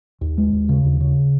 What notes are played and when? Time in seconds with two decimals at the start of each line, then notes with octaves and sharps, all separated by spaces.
0.21 D#2
0.38 G#3
0.53 D#2
0.69 C#3
0.85 D#2
1.00 C#3